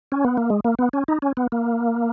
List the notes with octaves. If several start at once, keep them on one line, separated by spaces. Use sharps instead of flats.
C#4
B3
A#3
G#3
A#3
B3
C#4
D#4
C#4
B3
A#3